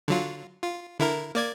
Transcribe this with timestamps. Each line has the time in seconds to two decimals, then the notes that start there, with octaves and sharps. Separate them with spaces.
0.08 D3 F#3 F4
0.62 F4
0.99 D3 E4 A#4
1.35 A#3 D5 G#6